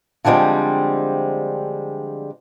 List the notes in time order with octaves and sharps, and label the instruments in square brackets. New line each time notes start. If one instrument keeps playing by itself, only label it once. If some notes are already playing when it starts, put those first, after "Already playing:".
[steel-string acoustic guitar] D3 F3 G3 G#3 C4